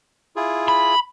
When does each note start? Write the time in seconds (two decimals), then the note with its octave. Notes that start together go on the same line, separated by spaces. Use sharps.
0.36 E4 F4 G#4
0.68 B5